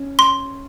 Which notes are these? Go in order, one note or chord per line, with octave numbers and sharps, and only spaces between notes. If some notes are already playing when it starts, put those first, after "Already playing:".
Already playing: C#4
C6